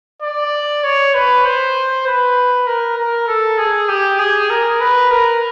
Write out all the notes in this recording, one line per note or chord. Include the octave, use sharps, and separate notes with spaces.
D5
C#5
B4
C5
B4
A#4
A#4
A4
G#4
G4
G#4
A#4
B4
A#4